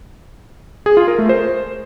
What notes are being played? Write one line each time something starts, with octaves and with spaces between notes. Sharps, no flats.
G#4
F4
A#4
A3
C5